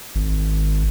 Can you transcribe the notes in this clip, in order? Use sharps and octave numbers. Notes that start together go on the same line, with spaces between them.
G#1